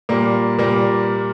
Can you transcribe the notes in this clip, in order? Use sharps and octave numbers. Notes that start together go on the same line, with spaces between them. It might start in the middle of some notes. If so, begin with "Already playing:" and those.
A#2 G3 A#3
A#2 G3 A#3